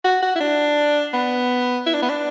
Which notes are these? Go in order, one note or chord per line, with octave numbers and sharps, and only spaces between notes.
F#4
F#4
E4
D4
B3
E4
D4
B3
D4